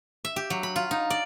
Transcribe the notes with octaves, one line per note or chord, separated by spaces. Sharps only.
E5
G4
F#3
B5
F4
D#4
D5